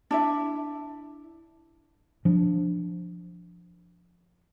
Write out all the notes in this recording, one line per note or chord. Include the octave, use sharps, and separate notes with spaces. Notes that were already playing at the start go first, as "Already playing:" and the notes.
D4 E4 E5
F3 D4